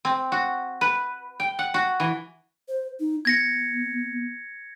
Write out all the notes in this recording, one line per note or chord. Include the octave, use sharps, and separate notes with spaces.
C4
F#4
B4
G5
F#5
F#4
E3
C5
D#4
B3 G#6 A#6 C#7